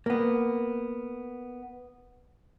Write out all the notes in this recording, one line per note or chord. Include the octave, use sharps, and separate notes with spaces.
A#3 B3